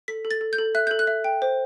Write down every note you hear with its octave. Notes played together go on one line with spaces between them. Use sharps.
A4 B6
A4
A6
A4
G6
A4
E5 F#6
A4 G6
F#6
E5
G5
C5